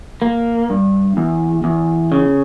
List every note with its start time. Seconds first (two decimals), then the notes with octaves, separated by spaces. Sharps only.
0.22 A#3
0.70 G2
1.17 E2
1.64 E2
2.12 C#3